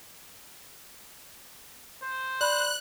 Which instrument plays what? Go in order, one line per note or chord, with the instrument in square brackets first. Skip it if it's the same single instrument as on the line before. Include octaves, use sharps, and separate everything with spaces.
[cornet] C5
[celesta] D5 B5 [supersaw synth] F#6